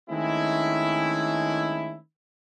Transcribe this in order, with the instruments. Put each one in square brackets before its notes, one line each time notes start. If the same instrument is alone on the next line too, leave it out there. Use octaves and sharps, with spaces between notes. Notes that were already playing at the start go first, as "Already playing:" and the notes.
[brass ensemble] D#3 G#3 A3 C4 C#4 E4